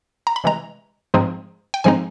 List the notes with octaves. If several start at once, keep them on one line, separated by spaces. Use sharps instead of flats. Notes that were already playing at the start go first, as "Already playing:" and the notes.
A#5
B5
C3 E3 G#3 A#5
G#2 F3 G#3 C4 D#4
G5
G#2 F3 G#3 C4 D#4 G#5